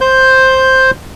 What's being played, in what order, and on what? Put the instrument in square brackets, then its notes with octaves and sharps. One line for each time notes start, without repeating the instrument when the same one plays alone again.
[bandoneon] C5 G6